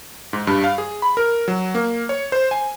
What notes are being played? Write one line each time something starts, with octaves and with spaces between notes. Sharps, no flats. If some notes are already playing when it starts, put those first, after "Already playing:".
G#2
G2
F5
G#4
B5
A#4
F#3
A#3
C#5
C5
G#5